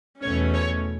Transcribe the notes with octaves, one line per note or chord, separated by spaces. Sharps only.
E2 B2 A3 C#4 C#5
C#5